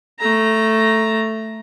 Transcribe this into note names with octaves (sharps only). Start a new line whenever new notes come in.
A3 A#5